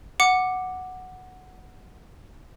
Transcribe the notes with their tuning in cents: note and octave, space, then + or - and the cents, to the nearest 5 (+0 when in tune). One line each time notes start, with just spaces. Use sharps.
F#5 +0 D6 +5